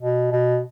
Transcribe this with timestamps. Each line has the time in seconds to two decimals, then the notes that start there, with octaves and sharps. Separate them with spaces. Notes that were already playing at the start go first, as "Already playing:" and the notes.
0.01 B2
0.32 B2